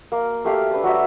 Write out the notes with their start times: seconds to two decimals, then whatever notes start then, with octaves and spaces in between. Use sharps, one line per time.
0.12 A#3
0.45 A3 G4 F5
0.71 D4 B4 D5
0.83 F#3 F#4 E5